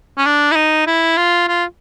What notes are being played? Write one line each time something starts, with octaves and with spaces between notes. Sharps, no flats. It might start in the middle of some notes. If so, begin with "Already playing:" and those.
C#4
D4
E4
D#4
E4
F4
F4